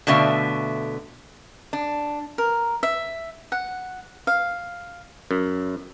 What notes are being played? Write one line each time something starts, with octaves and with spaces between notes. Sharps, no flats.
B2 D3 A3 E5 F5
D4
A#4
E5
F#5
F5
F#2